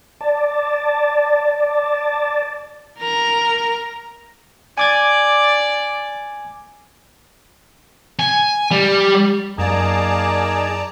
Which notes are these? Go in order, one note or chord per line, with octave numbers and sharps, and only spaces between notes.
D5 A5
A#4 A#5
D5 G#5 D6 G#6
G#5
G3
F#2 A#3 D#4 G#4 D5 A5 A#5